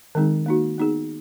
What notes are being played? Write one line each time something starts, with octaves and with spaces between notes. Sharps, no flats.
D#3 G#3 C4 D#4 G#4
A#3 D#4 F#4
B3 D#4 G#4